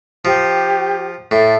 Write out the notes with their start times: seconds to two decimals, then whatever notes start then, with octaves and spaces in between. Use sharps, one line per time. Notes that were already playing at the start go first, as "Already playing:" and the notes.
0.25 F3 G4
1.31 A2 A4